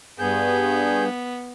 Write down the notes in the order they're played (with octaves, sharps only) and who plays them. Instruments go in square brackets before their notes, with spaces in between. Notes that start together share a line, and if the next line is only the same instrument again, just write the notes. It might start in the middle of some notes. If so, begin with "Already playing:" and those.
[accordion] G2 [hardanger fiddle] B3 [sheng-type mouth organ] G#4 G6